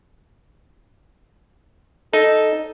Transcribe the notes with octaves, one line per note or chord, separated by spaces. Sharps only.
D#4 A4